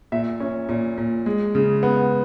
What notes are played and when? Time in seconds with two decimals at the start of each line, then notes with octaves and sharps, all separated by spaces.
0.12 A#2 E5
0.40 C#4
0.69 A#2
0.98 A#2
1.26 G#3
1.55 C#3
1.83 B3